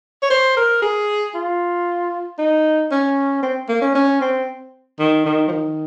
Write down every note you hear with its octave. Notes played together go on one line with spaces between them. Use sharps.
C#5
C5
A#4
G#4
F4
D#4
C#4
C4
A#3
C#4
C#4
C4
D#3
D#3
F3
D#3